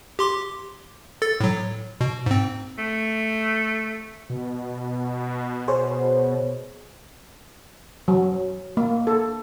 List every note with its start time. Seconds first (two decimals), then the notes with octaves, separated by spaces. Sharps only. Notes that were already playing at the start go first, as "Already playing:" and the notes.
0.19 G4 C6 D6
1.22 A4 A6
1.40 A2 F#3
2.01 B2
2.26 G#2 C4
2.79 A3
4.30 B2
5.68 G#4 C5 C#5
8.08 F#3
8.77 A#3
9.07 A4